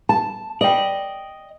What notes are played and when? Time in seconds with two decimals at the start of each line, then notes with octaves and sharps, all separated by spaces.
0.09 A5
0.61 D5 D#5 G5